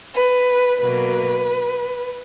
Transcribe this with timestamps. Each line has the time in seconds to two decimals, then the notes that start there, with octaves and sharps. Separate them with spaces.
0.15 B4
0.81 B2 F#3 A#3 B4